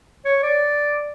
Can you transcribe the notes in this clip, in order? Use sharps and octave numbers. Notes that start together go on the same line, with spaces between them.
C#5
D5